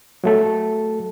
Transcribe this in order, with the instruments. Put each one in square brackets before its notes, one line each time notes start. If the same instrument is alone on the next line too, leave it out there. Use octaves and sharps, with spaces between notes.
[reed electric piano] F#3 A3 A4